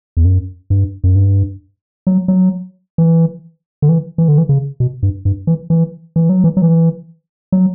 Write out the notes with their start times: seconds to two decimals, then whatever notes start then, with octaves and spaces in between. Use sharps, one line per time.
0.17 E2
0.25 F#2
0.70 G2
1.04 F#2
1.16 G2
2.07 F#3
2.28 F#3
2.98 E3
3.82 D3
3.89 E3
4.18 E3
4.28 D3
4.38 E3
4.49 C#3
4.80 B2
5.03 G2
5.25 G2
5.47 E3
5.70 E3
6.16 E3
6.29 F#3
6.44 E3
6.57 F#3
6.62 E3
7.52 F#3